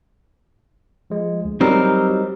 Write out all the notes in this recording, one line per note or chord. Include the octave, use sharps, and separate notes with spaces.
F3 G#3
D2
F#3 G3 C4 D#4 A#4 D#6